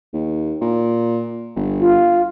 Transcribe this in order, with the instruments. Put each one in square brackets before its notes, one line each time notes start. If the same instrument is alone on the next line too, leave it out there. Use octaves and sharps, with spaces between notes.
[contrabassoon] D#2
A#2
G1
[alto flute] F4